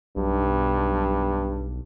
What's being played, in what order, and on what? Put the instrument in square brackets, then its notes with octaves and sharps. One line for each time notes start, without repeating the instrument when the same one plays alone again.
[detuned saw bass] B1 [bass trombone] G2